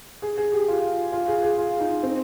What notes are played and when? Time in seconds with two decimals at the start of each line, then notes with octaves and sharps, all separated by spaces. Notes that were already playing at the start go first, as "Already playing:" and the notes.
0.22 G#4
0.37 G#4
0.52 G4
0.68 F4
1.12 F4
1.28 G#4
1.43 G#4
1.58 F4
1.80 D#4
2.03 C4